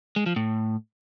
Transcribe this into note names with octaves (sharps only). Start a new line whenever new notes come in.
G#3
F3
A2